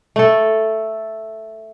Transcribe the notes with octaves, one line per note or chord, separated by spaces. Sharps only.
A3 A4